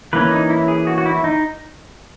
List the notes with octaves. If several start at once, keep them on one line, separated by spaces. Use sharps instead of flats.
E3 A#3 C#4 B4
D#4
E4
G#4
F#4
F#4
E4
D#4